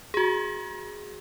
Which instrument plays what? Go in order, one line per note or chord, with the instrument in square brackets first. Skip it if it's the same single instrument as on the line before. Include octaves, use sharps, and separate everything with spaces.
[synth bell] F#4 G#4